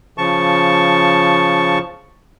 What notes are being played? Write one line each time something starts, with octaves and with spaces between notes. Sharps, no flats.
C#3 F3 A5 C#6